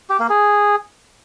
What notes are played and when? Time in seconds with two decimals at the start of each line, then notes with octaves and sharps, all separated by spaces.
0.10 G4
0.20 A#3
0.30 G#4